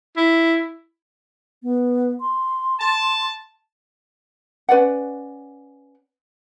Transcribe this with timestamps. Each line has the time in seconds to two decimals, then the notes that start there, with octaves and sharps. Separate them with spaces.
0.17 E4
1.63 B3
2.20 C6
2.80 A5
4.69 C#4 B4 D5 F#5